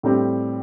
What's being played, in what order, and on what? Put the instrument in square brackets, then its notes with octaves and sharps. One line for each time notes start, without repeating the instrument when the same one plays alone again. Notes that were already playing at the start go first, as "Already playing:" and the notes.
[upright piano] A2 G3 C4 G4